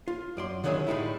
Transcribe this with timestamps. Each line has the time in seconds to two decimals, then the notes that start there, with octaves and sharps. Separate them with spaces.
0.08 F4
0.37 F#2 D5 C6
0.64 D3 D#3 F#3 G#3 C#4 E4
0.87 A2 G3 G#3 D#4 E4